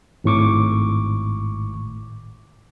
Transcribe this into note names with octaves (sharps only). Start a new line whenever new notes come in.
G#1 A2 C#6 D6